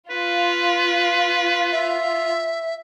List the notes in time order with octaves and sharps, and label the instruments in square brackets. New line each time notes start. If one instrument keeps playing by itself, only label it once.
[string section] F4 [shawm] B4
[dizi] E5